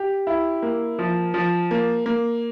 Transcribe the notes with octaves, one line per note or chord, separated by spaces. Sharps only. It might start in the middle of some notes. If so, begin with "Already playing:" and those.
Already playing: G4
E4
A#3
F3
F3
A#3
A#3